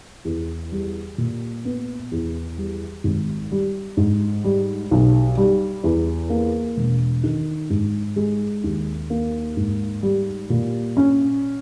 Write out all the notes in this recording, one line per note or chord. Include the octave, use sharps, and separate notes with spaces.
E2
G3
A#2
B3
E2
G3
G#1
G3
G#2
G3
B1
G3
E2
A#3
E1
D#3
G#2
G#3
D#2
A#3
G#2
G3
A#2
C#4